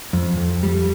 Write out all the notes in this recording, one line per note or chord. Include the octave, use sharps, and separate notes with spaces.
F2
F2
G3